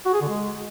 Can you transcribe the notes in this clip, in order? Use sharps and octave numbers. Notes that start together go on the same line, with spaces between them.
F#4
G#4
D3
G#3